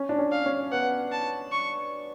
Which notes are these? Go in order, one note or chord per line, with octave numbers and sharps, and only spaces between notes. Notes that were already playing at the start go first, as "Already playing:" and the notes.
Already playing: C#4
D4
C#4
F5
C#4
B3 F#5
A5
C#6